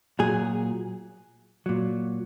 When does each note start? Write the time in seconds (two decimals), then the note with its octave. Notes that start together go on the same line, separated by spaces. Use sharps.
0.19 A#2 F#3 G#4
1.66 A#2 F#3